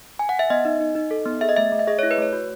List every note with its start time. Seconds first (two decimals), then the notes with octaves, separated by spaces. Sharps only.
0.19 G#5
0.29 F#5
0.39 E5
0.50 B3 D#5
0.65 D#4
0.80 D#4
0.95 D#4
1.11 A4
1.26 B3
1.41 G#4 E5
1.49 D#5
1.56 A3 E5
1.72 A3
1.79 E5
1.88 G#4 D#5
1.99 E4 C#5
2.11 B4
2.18 A3 C#5
2.33 F#4